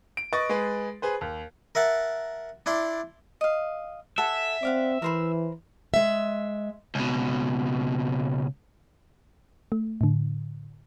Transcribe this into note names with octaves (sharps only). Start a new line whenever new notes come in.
D7
B4 D#5 C#6 A6
G#3 G#4 B4
G#4 B4 C5
D#2
A#4 E5 F#5 A5
D4 E4 D5 C6
D#5 F5
A4 E5 F#5 G#5
C4 D5 F5 F#5
E3 A#4 C5 B5
G#3 E5
C#2 B2
A3
A2 D3